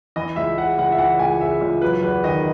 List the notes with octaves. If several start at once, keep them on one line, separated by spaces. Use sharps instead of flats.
E3 D#5
C#2 E5
C#3 F#5
C#2 F#5
E5
E3 F#5
C#2 G#5
C#3 E5
C#2
F#3 B4
E2 B4
D#3 D#5